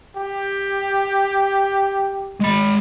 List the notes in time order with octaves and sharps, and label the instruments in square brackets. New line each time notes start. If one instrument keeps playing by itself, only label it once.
[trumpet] G4
[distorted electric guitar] G#3 B5